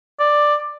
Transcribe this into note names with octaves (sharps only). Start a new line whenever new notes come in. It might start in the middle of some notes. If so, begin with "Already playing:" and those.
D5